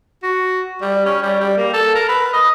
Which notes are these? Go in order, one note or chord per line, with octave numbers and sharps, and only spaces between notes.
F#4
G3
C#4
G3
G3
A#3
A4
A#4
B4
D#5